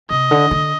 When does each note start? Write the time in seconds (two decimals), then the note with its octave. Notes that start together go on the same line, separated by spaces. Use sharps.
0.10 C3 D#5
0.31 D3
0.51 D3